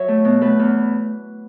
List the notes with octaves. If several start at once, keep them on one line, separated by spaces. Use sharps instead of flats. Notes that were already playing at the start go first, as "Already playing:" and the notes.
Already playing: F#3 C#5 E5
A3
B2
A3 B4
E2